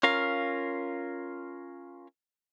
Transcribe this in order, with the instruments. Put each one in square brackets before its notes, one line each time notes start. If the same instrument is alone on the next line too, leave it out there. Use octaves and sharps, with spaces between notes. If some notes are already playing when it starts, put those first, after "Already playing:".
[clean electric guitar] C#4 F4 A#4 F5